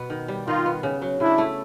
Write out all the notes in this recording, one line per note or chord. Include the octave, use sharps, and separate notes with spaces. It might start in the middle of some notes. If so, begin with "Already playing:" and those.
Already playing: B2 B3
D#3
G3
D#3 D#4 F4
B3
C#3
F#3
C#3 D4 E4
A3